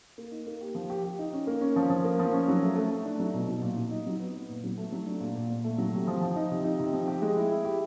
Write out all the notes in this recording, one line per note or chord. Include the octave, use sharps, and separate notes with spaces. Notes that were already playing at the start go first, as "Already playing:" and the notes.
A#3
D#4
A#3
G4
F3
G4
G4
D#4
C#4
A#3
C#4
F3
F3
A#3
F3
C#4
F#3
A3
A3
A3
D4
F#3
B2
F#3
A#2
F#3
D#4
F#3
B3
B3
A#2
F#3
A3
F#3
D4
A#2
A#2
A#2
A3
F#3
C3
F3
F3
D#4
C3
D#4
C3
F3
G4
G#3
E4
E4
G4